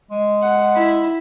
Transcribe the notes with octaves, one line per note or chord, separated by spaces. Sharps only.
G#3
F#5
E4 B5